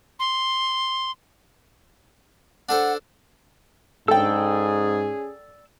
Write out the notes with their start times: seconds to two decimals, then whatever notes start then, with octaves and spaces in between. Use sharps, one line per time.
0.19 C6
2.69 D4 A4 C5 F#5
4.08 G#2 C#4 G#4 A4 D5 G5 E6